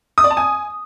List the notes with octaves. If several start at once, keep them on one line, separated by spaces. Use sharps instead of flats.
D#6
D5
A5
G#5